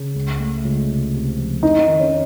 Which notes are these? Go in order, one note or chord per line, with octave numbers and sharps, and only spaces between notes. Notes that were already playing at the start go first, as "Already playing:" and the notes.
Already playing: C#3
C#2
A3
C#2
C3
C3
F3
F2 D#4
D#3
C#4